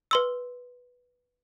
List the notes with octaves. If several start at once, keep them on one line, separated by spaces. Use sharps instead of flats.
B4 C6 E6